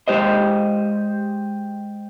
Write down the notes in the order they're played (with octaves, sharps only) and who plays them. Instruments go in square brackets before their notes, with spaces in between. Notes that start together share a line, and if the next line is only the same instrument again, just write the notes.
[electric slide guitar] G#3 G4 C5 D#5